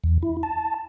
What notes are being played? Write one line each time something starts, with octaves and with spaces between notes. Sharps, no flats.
E2
E4
A5